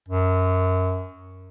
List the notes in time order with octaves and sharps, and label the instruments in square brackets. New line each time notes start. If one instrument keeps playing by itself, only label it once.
[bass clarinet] F#2